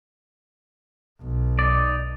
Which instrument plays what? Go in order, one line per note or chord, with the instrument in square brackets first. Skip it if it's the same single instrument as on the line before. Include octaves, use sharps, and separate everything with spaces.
[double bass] B1
[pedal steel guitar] D#4 D5